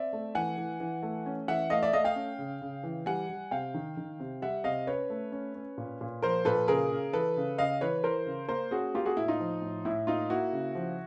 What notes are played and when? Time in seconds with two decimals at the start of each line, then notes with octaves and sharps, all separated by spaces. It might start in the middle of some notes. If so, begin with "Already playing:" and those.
Already playing: C4 D5 E5
0.13 A3
0.35 E3 F#5 G#5
0.57 E3
0.80 E3
1.03 A3
1.26 C#4
1.48 E3 E5 F#5
1.70 A3 D#5 F5
1.83 D5 E5
1.93 A3 D#5 F5
2.04 F5 G5
2.16 C#4
2.39 C#3
2.61 C#3
2.83 E3
3.06 G3 F#5 G#5
3.29 G3
3.51 C3 F5 G5
3.74 D#3
3.97 D#3
4.20 C3
4.42 G3 E5 F#5
4.64 C3 D#5 F5
4.87 C#4 B4 C#5
5.10 A3
5.32 C#4
5.55 C#4
5.78 A#2
6.01 A#2
6.22 F3 A#4 C5
6.45 A#2 A4 B4
6.68 C#3 G#4 A#4
6.91 C#3
7.13 E3 A4 B4
7.37 C#3
7.58 C#3 D#5 F5
7.81 E3 B4 C#5
8.04 E3 A#4 C5
8.26 C#3
8.49 A#3 A#4 C5
8.71 C#4 F#4 G#4
8.94 A#3 F4 G4
9.05 F#4 G#4
9.17 A2 E4
9.28 D#4 F4
9.40 F3
9.62 A2
9.85 A2 E4
10.07 A#3 D#4 F4
10.30 A#3 E4 F#4
10.52 C#3
10.75 F3